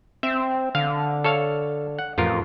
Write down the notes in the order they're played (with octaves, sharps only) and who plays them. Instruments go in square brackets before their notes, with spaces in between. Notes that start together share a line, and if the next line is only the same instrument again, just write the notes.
[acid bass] C4 [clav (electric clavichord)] E5
[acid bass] D3 [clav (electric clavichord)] F5
[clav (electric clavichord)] A4 C#5 F5
F#5
[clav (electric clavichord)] A1 F4 A#4 [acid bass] F2